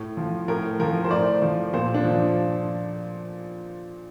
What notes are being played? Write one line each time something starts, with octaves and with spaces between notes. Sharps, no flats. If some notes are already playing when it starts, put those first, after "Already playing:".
Already playing: A2
F3
A2 A#4
F3 A#4
C5
A2 D5
F3
A#2 C5
D4
F3